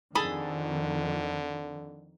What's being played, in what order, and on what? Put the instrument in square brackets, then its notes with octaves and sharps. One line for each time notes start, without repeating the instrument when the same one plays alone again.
[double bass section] F2 D#3 [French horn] D3 [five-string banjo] G#4 A4 B5